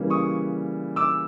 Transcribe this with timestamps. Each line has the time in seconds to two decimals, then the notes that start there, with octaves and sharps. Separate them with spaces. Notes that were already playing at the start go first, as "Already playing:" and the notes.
Already playing: C#3 E3 G3 A#3
0.10 C#6 D#6
0.96 D6 E6